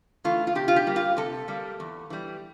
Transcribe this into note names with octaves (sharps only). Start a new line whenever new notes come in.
E3 A3 F4
F4
C3 G4
F4
G4
G3 A#3
F4
C3 A4
G3 A#3
E2
E3 G3